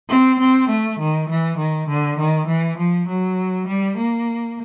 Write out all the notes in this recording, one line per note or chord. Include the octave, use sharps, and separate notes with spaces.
C4
C4
A3
D#3
E3
D#3
D3
D#3
E3
F3
F#3
G3
A#3